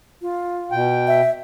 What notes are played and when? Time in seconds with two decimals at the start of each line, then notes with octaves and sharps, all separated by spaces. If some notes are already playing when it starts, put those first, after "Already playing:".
0.22 F4
0.72 B2 G5
1.07 E5